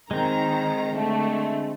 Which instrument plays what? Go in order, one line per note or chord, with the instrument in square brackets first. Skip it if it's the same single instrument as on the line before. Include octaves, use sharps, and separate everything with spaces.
[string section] D#3 A#5 [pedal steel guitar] G#3 C4
[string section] D3 A3